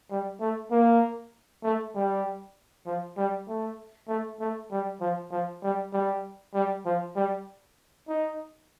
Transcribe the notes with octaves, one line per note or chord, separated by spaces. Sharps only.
G3
A3
A#3
A3
G3
F3
G3
A3
A3
A3
G3
F3
F3
G3
G3
G3
F3
G3
D#4